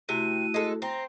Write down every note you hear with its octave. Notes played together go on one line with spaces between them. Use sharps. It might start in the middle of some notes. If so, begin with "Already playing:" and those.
C3 A3 E4 F#4 D#7
G#3 A4
C4 A#5